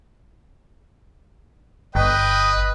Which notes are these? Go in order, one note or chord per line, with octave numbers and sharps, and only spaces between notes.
G1 B4 D#5 G5